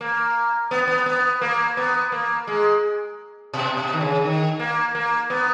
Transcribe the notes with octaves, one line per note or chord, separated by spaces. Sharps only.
A#3
B3
B3
B3
A#3
B3
A#3
G#3
B2
B2
D#3
C#3
D#3
A#3
A#3
B3